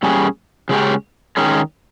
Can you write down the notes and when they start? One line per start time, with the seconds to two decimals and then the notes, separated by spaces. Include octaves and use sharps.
0.03 A#2 G3 C#4 G#4
0.69 C#3 G#3 C#4 G4
1.37 D#3 G#3 C#4